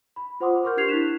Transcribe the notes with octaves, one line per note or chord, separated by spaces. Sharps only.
B5
F4 C5 F#5 C6 D6 D#6
A#4 C6 C#6 F6 G6
D4 G4 G6 G#6 C7 F7
E4 F#6 B6 E7